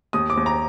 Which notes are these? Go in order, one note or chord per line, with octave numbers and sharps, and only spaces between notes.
D#2 D#6
D6
D#2
A#5